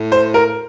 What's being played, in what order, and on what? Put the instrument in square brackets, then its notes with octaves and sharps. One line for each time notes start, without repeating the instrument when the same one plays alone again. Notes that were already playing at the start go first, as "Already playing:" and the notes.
Already playing: [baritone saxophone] A2
[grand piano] C5
A#4